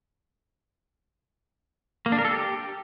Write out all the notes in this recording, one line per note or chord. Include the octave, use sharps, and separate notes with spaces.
A#3
D4
A#4
A4
G4